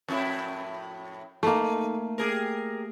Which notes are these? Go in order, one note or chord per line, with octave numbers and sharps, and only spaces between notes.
F2 A2 E4
A3 A#3 D#4
G4 G#4 A#4